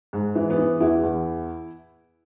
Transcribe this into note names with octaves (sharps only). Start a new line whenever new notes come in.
G#2
E3
B3
E3
E2 E4
E2